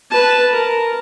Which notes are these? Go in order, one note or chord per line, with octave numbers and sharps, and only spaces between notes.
B4 A5
A#4